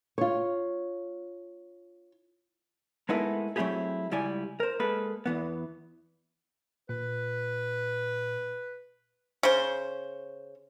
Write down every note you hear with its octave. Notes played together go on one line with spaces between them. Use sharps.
F4 C#5
G#3 A3 B3 D#4 E4 A#4
F#3 A3 C4 E4 G4 G#4
C#2 G3 E4 D5 G#5
A#4 C5
G#3 A#3 A4 B4
E2 E3 B3
A#2 B4
C#3 C5